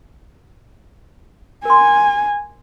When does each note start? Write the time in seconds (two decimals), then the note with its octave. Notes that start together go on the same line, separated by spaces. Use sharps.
1.65 A#4 G#5 C6